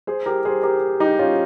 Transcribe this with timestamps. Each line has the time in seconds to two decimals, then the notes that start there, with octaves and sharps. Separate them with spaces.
0.07 G#4 C5
0.26 G4 A#4
0.45 G#4 C5
0.63 G4 A#4
1.00 D#4 G4
1.19 C#4 F4